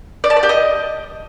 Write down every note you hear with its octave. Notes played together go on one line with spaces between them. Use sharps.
D5
A5
D5
G4
D#5